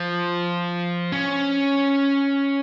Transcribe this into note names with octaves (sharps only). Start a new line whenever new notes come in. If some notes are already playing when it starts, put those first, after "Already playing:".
Already playing: F3
C#4